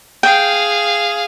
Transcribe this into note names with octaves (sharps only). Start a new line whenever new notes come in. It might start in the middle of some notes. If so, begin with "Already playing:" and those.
G#4 F5 G5